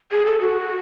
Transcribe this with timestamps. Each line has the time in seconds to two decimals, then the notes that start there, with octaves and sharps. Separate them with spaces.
0.12 G#4
0.26 A4
0.40 F#4